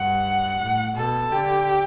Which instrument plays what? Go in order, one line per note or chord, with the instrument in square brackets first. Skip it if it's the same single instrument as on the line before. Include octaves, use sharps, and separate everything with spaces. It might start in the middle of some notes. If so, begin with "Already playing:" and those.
Already playing: [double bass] G2 [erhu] F#5
[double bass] A2
[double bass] B2 [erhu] A4
[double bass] D3 [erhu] G4